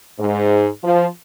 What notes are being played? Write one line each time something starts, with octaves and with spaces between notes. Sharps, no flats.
G#2
F3